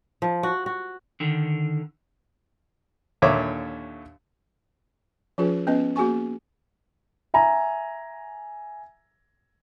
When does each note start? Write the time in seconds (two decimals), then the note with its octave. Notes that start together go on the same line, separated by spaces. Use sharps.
0.22 F3
0.43 F#4
0.66 F#4
1.20 D3 D#3
3.22 D#2 A#2 D3 C#5 E5 D6
5.38 F3 C#4 F4 G#4 B4
5.67 B3 C#4 B4 D#5
5.96 A#3 F#4 G#4 G#5 C#6
7.34 E5 G#5 A#5